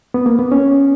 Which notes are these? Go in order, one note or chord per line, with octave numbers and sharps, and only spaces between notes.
B3
A#3
B3
C#4